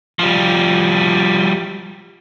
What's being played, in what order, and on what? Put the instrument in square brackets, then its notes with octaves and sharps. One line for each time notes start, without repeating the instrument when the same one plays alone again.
[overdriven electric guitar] F3 G3